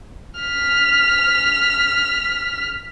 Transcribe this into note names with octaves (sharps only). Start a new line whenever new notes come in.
F6 B6